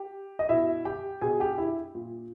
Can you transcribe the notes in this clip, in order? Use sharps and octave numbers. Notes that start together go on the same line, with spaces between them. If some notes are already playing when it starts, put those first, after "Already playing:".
Already playing: G4
D#5
B2 E4 E5
G4 G5
B2 G#4 G#5
G4 G5
E4 E5
A#2